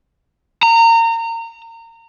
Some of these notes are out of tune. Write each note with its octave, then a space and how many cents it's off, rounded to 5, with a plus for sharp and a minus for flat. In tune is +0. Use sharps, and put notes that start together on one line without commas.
A#5 -25